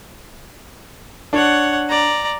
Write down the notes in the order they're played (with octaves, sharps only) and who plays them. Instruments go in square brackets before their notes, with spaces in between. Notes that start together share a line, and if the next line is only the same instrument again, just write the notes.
[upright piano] D4 [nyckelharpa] C#5 F#5
[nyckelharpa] D5 A#5